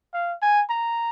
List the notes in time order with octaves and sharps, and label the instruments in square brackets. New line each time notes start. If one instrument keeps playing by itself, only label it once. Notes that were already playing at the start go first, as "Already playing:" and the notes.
[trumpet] F5
G#5
A#5